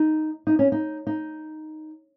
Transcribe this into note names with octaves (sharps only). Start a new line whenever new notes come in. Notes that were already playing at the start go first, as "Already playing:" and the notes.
Already playing: D#4
D#4
C#4
D#4
D#4